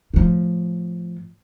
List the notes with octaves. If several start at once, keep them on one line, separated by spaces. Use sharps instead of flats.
A2 F3